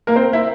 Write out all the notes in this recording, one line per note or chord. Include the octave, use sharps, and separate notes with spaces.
A#3 A#4
C4 C5
E4 E5